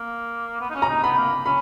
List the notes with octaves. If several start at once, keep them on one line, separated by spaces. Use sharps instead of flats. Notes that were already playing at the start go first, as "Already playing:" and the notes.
Already playing: A#3
B3
D#4
C#4
A#5
D#4
B3 B5
A#3
C#4 B5